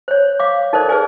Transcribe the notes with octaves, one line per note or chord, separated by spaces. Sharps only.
C5 C#5
F5 D6
D#4 A4 A#4 C5 D5
G#4 B4 D5 G#5